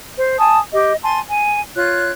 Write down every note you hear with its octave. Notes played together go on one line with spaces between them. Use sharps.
C5
G#5 A5 D#6
G4 D#5
G#5 A5 C6
G#5
F4 C#5 F#6